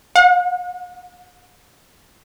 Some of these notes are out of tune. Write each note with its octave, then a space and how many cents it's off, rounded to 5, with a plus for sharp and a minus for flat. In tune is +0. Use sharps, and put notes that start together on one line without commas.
F#5 -40